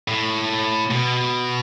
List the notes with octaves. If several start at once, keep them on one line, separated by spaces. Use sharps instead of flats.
A2
B2